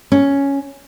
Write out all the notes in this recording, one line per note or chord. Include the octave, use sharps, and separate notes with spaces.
C#4